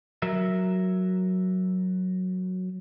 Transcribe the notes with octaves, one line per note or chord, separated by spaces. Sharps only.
F#3 A#4 E5